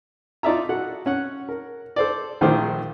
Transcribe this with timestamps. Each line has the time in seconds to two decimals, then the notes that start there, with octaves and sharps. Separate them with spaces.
0.43 D#4 F4 D5 E5 A#5
0.69 F#4 A4 F#5
1.06 C#4 F#5
1.49 A#4
1.96 A4 C5 D5
2.41 A#1 D#3 A3 F4 C5 D6